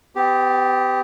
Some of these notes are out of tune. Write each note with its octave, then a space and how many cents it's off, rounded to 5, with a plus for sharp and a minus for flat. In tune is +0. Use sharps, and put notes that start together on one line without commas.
B3 +40 G4 +0